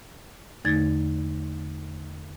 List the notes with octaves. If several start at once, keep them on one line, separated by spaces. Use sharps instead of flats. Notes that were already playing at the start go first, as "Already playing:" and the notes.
E2 D3 A3 D#4 G#6 A6